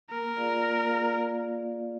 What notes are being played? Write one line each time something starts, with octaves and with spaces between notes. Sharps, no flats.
A#3 A#4
F4 G#4 D5 F5
A#3
F4 G#4 D5 F5